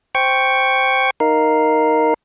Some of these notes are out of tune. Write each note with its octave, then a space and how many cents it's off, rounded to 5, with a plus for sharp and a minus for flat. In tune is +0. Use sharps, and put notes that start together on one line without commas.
C5 +0 G5 +0 C#6 +0
D#4 +0 A#4 +0 F5 +0